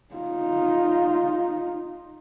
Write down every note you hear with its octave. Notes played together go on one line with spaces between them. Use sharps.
D#4 F4